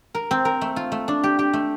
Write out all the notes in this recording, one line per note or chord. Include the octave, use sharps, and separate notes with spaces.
A#4
C4
A#4
A3
F4
A3
D4
G4
G4
A3